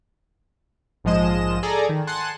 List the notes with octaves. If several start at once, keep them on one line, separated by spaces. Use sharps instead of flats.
A#1 G#2 F3 G#3 D#5 E7
G#4 A4 D5 G#5 A#5
D#3
F#5 G#5 A5 C6 F#6